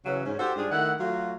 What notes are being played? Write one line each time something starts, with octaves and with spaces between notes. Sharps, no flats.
C#3 E3 F#3 C#4
G#2 C#4
F#4 G4 A4 C5
G#2 G3 D4 F4 G#4
D#3 A3 E4 F#5
F#3 A3 F4 F#4